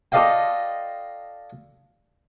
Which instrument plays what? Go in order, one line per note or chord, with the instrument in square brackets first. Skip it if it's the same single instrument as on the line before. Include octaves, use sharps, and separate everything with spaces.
[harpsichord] F4 A4 D5 D#5 F5 G5